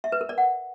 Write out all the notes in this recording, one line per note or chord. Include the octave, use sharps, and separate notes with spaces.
E5
B4
A#4
D5
F#5